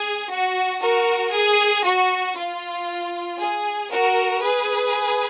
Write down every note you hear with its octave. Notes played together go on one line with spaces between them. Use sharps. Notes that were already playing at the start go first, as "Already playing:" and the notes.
Already playing: G#4
F#4
F#4 A#4
G#4
F#4
F4
G#4
F#4 A#4
G#4 B4